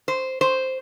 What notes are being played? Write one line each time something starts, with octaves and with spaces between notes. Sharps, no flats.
C5
C5